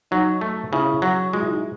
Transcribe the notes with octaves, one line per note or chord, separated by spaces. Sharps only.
F#3 D#4
A3
C#3 C#4 E4
F#3
G#3 F#4
E4
D#4 F#4